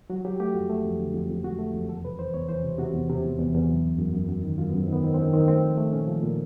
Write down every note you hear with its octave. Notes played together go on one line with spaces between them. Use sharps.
F#3 F#4
F#3 G4
A3 G4
F2 F#4
A3
F2
D3
F2
F2
F2 F#4
A3
F2
E2 A4
C3 B4
E3 C5
E2 C#5
E3 C5
C3
C3 F#4
E2
C3
E2
E2
E2
F#3
F#2
F#2
F#2
F#2
D#3
F#2 F4
B3
F#2
C4
D#3 B3
D#3 C4
C4
D#3 C#4
D#3 C4
A3 C4
F3
A3
A#2 C#4
F3
A#2